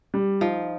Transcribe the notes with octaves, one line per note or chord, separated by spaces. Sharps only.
G3
F3 D#4